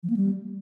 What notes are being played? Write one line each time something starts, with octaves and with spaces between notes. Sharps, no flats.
F3
A#3
G3